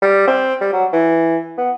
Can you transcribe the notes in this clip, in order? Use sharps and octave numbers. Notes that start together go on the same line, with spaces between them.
G3
C4
G3
F#3
E3
B3